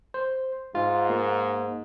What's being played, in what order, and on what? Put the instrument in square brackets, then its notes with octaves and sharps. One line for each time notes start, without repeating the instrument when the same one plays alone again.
[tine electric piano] C5
[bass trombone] G#2 [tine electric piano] F4
[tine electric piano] A#3